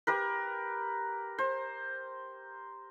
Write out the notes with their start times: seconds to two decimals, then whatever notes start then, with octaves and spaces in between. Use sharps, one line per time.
0.07 G4 A#4 B4
1.38 C5